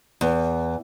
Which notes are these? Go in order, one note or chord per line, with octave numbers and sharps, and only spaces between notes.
E2